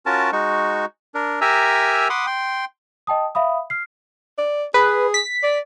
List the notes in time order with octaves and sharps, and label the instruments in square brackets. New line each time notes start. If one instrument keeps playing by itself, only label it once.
[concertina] C#4 F4 F#4 A#4 A5
G#3 D#4 F#4 C#6
D4 A#4
G4 A#4 E5 G#5 A#5 E6
F#5 B5 C6 D6 D#6
G5 C6
[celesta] D#5 G5 A5 D#6
E5 F5 B5 D#6
F6 C7
[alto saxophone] D5
[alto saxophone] G#4 [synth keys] B4
[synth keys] B6
[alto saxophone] D5